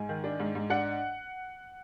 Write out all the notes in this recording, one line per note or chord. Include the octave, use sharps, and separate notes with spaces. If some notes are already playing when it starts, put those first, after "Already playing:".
Already playing: G#2 G#5
D#3
D4
G#2
G#2
D4 F#5